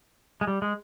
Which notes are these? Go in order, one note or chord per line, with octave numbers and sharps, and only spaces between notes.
G#3
G3
G#3